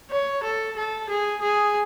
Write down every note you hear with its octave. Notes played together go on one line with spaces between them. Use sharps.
C#5
A4
A4
G#4
G#4